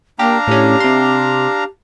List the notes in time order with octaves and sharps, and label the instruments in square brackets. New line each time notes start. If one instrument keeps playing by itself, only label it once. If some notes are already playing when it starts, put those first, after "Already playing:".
[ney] A#3 [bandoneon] D4 F5 A#5 [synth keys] G4
[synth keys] A2 C#4 [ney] G4
[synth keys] C3 C6